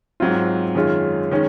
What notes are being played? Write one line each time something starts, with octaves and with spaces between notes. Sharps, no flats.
G#2 F#3 C4 F4
F#2 D#3 G#3 C#4 F4
D#3 G#3 C#4